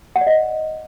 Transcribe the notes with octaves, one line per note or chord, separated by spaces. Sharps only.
F#5
D5
D#5